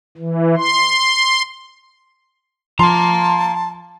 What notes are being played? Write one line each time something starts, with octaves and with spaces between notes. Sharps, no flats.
E3
C6
F3 F5 A5 A#5 C6